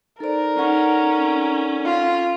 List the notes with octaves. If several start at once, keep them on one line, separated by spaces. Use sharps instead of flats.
D#4 A4 A#4 C5 D5
C#4 D#4 F#5 C#6
F4